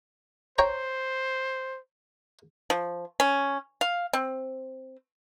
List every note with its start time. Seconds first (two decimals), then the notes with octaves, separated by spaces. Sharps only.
0.58 C5 C#5 G5 A#5
2.70 F3
3.20 C#4
3.81 F5
4.13 C4